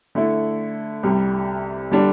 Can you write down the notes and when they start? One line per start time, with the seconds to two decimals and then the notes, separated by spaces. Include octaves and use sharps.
0.15 D3 A3 E4
1.03 C2 C3 G3
1.91 D3 G3 D4